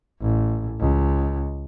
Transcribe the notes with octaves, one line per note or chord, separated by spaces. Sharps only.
A1
C#2